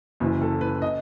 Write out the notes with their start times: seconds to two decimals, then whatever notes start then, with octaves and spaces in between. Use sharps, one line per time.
0.20 F#1 F#2 E3
0.41 A4
0.61 B4
0.82 D#5